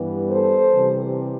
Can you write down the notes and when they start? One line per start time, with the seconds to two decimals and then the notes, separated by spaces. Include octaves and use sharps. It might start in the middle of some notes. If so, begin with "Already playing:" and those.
Already playing: G2 E3 G3 B3
0.30 A4 C5
0.75 C3 E3 G3